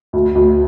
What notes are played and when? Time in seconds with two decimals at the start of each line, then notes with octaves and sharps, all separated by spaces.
0.13 D2
0.35 D2